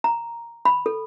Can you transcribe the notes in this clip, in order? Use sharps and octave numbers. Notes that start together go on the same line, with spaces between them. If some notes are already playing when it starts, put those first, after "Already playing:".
A#5
B5
A4